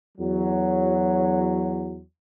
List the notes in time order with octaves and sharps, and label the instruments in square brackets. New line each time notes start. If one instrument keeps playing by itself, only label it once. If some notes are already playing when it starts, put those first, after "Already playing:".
[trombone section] E2 F#3